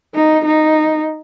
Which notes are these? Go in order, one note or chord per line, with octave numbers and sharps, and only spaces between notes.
D#4
D#4